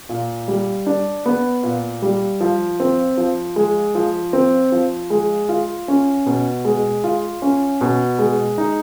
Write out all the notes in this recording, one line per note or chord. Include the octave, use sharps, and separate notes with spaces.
A#2
G3
D4
B3
A#2
G3
F3
C4
F3
G#3
F3
C4
F3
G#3
F4
C#4
B2
G#3
F4
C#4
B2
G#3
D#4